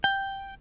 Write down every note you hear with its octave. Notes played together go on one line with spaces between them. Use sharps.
G5